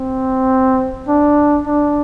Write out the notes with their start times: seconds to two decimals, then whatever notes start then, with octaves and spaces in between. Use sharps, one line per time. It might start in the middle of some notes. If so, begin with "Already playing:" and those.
Already playing: C4
1.08 D4
1.67 D4